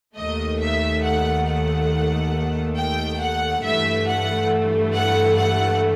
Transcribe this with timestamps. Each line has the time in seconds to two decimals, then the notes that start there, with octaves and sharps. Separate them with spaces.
0.16 D#2 D#3 A3 D#5
0.60 E5
1.03 F#5
1.47 F#5
2.76 G5
3.21 F#5
3.63 G2 E3 A3 E5
4.07 F#5
4.93 F#5
5.36 F#5